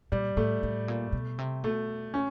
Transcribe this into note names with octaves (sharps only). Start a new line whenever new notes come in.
A#2 G3
A2 A3
A2
A#2
B2
C3
B2 A3
C#4